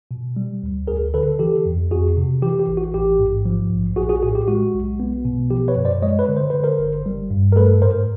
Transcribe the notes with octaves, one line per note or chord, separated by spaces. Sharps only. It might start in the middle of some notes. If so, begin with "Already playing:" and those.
B2
G3
D2
D2 G#4 A#4
D3 A4 B4
E3 G4 A4
F2
F2 F#4 G#4
C3
E3 G4
G4
A1
F#4
A1 G4
G#2
F3
A#1
A#1 F#4 G#4
F#4 G#4
A2 F#4 G#4
G4
G#3 F#4
B1
B3
B2
F3 G4
B4 C#5
F#2
C5 D5
G#3 C#5 D#5
B4 C#5
D3
C5
D3 B4
A#4 C5
G1
G3
G2
A#4
A3 A4 B4
G#2 A#4 C5